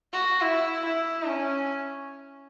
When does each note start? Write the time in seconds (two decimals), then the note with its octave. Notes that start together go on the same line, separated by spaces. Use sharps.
0.13 F#4
0.41 E4
0.84 E4
1.28 C#4